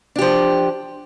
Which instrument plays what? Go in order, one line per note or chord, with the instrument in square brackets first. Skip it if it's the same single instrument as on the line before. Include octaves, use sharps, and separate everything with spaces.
[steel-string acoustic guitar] D4
G4
F3